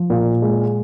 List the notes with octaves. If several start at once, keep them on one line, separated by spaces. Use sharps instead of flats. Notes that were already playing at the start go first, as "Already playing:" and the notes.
Already playing: F3
A#2
G#3